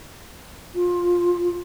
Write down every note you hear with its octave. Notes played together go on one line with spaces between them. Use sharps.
F4